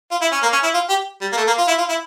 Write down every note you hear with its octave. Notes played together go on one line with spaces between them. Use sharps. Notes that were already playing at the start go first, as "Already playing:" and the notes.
F4
E4
C#4
A#3
C#4
E4
F4
G4
G3
A#3
A3
A#3
F4
E4
F4
E4